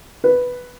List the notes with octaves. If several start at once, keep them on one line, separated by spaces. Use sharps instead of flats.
B4